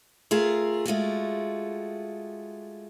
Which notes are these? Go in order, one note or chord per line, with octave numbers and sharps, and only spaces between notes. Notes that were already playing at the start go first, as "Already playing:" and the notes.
A3 F4 G#4 A#4
G#3 A3 F4 F#4